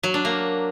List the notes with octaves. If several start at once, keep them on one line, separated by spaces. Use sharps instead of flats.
F#3
D4
A#3